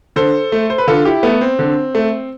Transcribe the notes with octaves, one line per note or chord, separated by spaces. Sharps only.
D3 A4 C5
A3
C5
B4
D3 F4 A4
E4 G4
A3 B3
C4
D3
A3